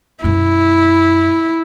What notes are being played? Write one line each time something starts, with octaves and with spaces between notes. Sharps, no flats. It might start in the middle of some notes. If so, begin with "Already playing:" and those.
F#2 B2 E4